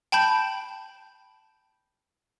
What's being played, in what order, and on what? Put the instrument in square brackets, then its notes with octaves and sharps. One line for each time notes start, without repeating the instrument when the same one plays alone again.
[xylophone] G5 A5 B5 G6